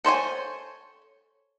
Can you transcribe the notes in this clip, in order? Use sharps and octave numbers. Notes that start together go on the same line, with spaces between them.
A4 C5 C#5 G#5